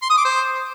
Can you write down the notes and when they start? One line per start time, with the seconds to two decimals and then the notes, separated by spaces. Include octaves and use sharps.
0.02 C6
0.10 D#6
0.17 D6
0.25 C5